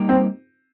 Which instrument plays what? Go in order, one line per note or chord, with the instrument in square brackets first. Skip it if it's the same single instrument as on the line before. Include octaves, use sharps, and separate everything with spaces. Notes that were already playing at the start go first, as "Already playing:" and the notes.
Already playing: [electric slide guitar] G3 A#3 D#4 G4
[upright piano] C4